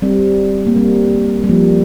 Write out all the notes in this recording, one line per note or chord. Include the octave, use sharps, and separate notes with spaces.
G3 C4
A#3
G3 C4
G3
F3 A#3